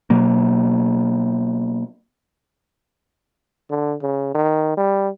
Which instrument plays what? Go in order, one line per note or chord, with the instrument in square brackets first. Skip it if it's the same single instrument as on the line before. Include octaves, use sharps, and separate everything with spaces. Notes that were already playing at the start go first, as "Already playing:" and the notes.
[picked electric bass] B2 F#3 A#3
[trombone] D3
C#3
D#3
G3